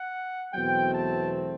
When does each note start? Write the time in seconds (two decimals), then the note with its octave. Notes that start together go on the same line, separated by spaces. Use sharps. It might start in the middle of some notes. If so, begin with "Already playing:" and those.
Already playing: F#5
0.53 E2 B2 F#3 A3 C4 G5
0.93 A5